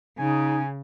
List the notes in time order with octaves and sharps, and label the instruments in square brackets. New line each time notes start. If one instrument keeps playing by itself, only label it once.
[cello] C#3 [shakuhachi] D#4 [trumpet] G#5